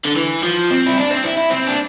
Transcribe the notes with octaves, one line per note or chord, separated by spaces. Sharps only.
D3
E3
F3
C4
E4
D4
C4
E4
E4
C4
D4